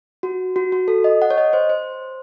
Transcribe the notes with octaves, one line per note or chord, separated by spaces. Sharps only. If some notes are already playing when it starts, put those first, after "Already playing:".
F#4
F#4
F#4
A4
D#5
F#5
C#5
D#5
C5
C5